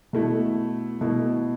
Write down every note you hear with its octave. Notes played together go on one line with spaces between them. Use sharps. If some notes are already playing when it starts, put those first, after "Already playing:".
B2 A3 E4
B2 A3 E4